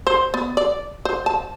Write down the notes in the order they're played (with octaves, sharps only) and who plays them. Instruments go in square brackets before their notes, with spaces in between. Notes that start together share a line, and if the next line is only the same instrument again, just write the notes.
[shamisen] C5
B3
D5
C5
A5